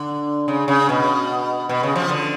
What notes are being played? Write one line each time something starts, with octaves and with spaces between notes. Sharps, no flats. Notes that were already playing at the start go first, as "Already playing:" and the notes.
Already playing: D3
C#3
C#3
B2
B2
C#3
F3
D3